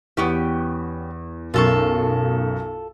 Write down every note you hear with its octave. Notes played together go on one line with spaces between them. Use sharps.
E2 B3 C#4 G4
B1 F#2 F4 A4 C#6